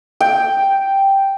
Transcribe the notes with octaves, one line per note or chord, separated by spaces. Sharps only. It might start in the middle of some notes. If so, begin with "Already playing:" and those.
G5